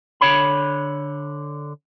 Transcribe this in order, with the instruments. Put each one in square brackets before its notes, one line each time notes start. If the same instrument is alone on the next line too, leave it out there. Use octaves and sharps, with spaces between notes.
[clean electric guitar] D3 C#5 B5